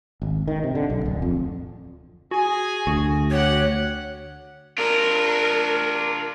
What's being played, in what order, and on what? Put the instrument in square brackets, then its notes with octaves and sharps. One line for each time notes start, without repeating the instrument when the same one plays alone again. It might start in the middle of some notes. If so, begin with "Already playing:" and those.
[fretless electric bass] G#1
D#3
C3
D3
B1
D1
F2
[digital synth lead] F#4 [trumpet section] G#4 G#5
[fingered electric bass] D2 [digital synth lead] F#4
[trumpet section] G4 F#5 [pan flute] C#5
[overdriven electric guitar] D4 F4 [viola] A#4